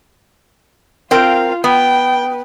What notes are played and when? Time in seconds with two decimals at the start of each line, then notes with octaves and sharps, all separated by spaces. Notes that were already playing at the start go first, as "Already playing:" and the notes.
1.11 C4 F4 A#4 F5 G5
1.64 B3 G5